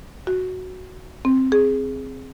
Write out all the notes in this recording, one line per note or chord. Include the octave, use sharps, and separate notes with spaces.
F#4
C4
G#4